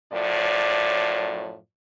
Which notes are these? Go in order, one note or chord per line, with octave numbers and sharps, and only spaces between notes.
F#2 A2 F3 D5